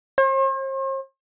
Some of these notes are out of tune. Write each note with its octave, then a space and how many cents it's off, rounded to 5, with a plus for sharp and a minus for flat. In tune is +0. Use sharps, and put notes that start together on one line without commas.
C5 +45